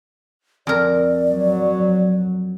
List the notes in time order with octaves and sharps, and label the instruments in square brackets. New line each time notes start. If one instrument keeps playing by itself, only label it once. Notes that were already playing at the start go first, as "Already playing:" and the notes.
[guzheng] F2 A#4 [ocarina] D5
[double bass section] F#3